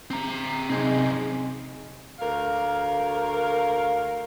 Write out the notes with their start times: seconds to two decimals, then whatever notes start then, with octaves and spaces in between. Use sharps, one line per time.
0.10 C4 A#5
0.70 F#2 C3 C4 D#4 G#4
2.19 D2 A#4 F5